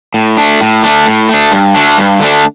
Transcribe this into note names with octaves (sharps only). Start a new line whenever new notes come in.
A2
A3 D4
A2
A3 D4
A2
A3 D4
G2
D3 A3 D4
G2
D3 A3 D4